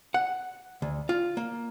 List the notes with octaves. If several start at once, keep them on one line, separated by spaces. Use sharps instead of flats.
F#5
D2
F4
A#3